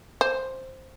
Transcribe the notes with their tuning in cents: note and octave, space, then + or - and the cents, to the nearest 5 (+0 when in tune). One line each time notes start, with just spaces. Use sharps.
C5 +5